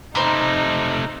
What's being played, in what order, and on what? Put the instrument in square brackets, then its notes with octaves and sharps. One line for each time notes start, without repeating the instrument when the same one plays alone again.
[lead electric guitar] C3 A3 [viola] D#4 [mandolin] C5 A#5 B5